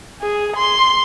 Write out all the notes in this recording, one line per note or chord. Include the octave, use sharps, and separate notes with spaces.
G#4
C6